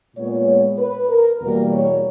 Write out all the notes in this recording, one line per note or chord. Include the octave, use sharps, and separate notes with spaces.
A#2 G#3 B3 C#5
B4
A#4
E2 B2 G3 A#3 A#4
C#5